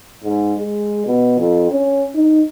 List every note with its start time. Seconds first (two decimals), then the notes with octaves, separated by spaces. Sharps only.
0.24 G#2
0.59 G#3
1.06 B2
1.39 F2
1.71 C#4
2.15 D#4